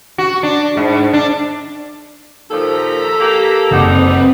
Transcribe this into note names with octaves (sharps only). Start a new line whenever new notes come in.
F#4
D4
G#2
D4
D#2 A#2 F3 A4 A#5 B6
A#3 G4
F#1 G3 C4 D#4 B4 F#5 D6